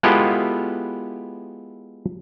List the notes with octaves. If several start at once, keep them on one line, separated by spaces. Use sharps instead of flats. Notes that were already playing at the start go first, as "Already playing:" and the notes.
G#3 B3 E4 F4 G4 A4